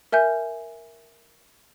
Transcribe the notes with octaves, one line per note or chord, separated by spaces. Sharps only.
A#4 E5 G#5 G6